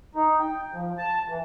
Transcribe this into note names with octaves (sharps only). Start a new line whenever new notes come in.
D#4
G5
F3
A5
E3